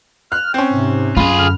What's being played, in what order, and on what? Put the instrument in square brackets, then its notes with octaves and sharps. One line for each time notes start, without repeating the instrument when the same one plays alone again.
[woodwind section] F6 [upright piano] F#6
[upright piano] C4 C#4 [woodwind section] G5
[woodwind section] G#2 C3
[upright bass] F#2 [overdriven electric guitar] F4 G#4 [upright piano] B5
[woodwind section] D3 F6